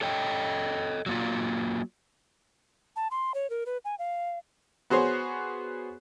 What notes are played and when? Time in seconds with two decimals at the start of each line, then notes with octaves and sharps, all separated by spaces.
0.01 A4 C#5 D#5 G5
1.06 F#3 A#3 F4
2.96 A5
3.11 C6
3.34 C#5
3.50 A#4
3.66 B4
3.85 G#5
3.99 F5
4.90 B3 F#4 G#4 C5 C#5